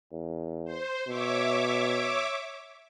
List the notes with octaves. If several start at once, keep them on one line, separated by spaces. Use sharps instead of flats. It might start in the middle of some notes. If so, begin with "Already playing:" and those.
E2
C5
B2 C#5 E5 D6